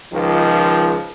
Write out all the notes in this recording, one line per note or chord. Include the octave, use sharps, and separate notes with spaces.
C#2 D#3 F3